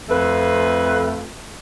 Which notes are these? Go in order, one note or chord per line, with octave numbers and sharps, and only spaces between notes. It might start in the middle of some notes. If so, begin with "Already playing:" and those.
F2 A3 F4 B4